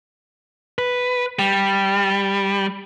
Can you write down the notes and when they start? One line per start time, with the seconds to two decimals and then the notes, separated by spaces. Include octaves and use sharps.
0.79 B4
1.39 G3